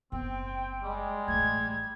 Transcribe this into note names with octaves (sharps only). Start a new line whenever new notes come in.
F#1 B3 C4 G5
G3 G#3
A1 A3 G#6